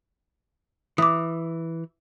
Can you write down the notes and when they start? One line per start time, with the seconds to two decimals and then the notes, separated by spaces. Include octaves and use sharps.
0.98 E3 D6 D#6